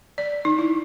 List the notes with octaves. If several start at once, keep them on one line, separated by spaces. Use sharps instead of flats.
D5
D#4
E4